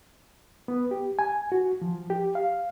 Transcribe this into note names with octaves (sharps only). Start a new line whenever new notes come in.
B3
G4
G#5
F#4
F3
G4
F5